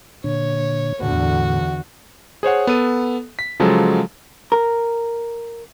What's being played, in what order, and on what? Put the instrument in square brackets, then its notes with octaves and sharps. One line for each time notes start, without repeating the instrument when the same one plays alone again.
[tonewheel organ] A#2 D3 [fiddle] C#5
[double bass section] E2 D3 [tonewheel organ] A2 [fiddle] F#4
[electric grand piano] G#4 C5 C#5 F#5
B3 A4 D#7
B6
C#3 F3 F#3 G#3 A4
[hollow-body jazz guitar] A#4